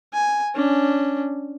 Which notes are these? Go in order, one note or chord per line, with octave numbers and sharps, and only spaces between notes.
G#5
C#4 D4